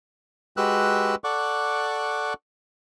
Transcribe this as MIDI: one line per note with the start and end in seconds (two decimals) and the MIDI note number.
0.57 1.15 56
0.57 1.15 66
0.57 1.15 67
0.57 1.15 71
0.57 1.15 88
0.57 1.15 90
1.24 2.34 69
1.24 2.34 74
1.24 2.34 78
1.24 2.34 85
1.24 2.34 86
1.24 2.34 90